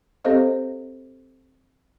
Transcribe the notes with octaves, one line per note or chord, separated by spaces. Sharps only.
C4 G4 A4 C5 D#5 F5